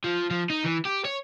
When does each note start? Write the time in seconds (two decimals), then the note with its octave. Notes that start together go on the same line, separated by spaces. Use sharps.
0.04 F3
0.31 F3
0.50 D#4
0.64 E3
0.85 G4
1.05 C#5